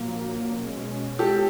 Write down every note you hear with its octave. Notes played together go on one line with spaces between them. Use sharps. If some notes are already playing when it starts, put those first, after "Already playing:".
Already playing: A#1 A#2 F#3 A#3
B2 G#3 C#4
G4 A4